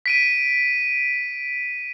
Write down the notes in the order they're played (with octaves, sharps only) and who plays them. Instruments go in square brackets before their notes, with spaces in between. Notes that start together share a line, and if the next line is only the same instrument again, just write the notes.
[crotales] B6 D7 D#7